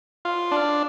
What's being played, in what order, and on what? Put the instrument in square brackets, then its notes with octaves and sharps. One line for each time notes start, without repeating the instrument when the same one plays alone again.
[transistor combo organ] F4
D4